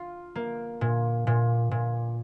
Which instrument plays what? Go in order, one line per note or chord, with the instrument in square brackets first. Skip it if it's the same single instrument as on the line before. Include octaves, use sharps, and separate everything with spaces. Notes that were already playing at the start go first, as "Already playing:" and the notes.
Already playing: [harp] F4
A#3
A#2
A#2
A#2